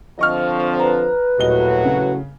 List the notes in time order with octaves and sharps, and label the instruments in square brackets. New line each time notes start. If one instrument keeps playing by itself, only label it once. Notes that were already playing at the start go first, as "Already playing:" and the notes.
[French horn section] D3 F3 C4 [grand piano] D#5 C#6 F6
[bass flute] B4 [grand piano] A#5
[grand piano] D#1 D#5 G7 [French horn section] A2 F#3 F#4
[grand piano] C#3